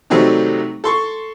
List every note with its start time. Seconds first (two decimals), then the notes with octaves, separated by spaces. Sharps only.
0.10 C3 D#3 F#3 G3 A3 C4
0.84 A4 C6 C#6